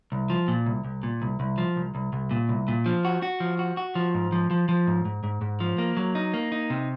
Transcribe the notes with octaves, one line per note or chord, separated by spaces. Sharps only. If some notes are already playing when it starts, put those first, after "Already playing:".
C2
F3
A#2
C2
C2
A#2
C2
C2
F3
C2
C2
C2
A#2
C2
A#2
F3
F#4
F#4
F3
F#4
F#4
F3
G#2
F3
F3
F3
G#2
G#2
G#2
G#2
F3
A#3
F#3
D#4
A#3
D#4
C3